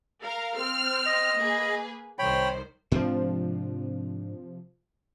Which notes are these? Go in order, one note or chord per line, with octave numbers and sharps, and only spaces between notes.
A#4 F5 A#5
C4 F6
D#5
A#3 G#4 B4
C2 D#3 C5 C#5 G5 B5
G#2 C3 F3 C4 D4